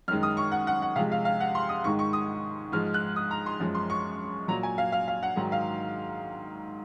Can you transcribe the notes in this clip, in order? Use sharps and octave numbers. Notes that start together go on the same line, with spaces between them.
F#2 D#3 G#3 F6
D#6
C#6
F#5
F#5
F#5
C3 F3 G#3 F5
F5
F5
F#5
C6
D#6
G#2 D#3 G#3 C#6
C#6
D#6
G#2 F3 G#3 F6
F#6
D#6
A#5
C6
F#2 F3 G#3
C6
C#6
A#2 F#3 A#5
G#5
F5
F5
F5
F#5
G#2 D#3 F#3
F5